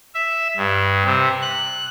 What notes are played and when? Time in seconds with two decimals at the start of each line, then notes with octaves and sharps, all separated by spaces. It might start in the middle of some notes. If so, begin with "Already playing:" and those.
0.15 E5
0.57 G2
1.05 C3
1.42 F#6